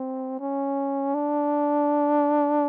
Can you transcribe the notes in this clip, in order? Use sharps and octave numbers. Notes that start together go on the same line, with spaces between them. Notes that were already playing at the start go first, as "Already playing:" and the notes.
Already playing: C4
C#4
D4